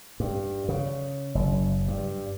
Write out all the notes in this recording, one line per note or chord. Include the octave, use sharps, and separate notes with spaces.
G2
C#3
F#1
G2